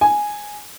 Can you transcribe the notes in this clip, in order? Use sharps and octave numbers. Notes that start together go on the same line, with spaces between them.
G#5